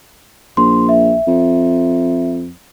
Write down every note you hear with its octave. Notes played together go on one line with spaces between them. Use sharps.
A#1 C6
E5
F2